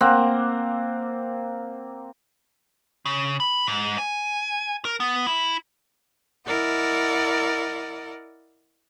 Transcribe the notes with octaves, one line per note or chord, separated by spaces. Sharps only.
A#3 C4 F#5
C#3
B5
G#2
G#5
A#4
B3
E4
E4 A#4 D5 D#5 F#5